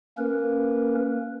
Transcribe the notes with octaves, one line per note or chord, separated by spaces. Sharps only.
A#3 C#4 A#4 B4